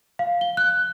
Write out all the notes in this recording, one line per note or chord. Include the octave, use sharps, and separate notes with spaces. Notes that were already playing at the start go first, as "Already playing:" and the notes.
F5
G7
F#6